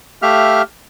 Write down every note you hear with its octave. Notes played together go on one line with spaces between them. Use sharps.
A3 G4 E5 F5 F6